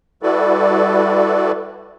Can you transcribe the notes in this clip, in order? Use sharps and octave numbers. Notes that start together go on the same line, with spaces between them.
G3 E4 F#4 A4 B4 D5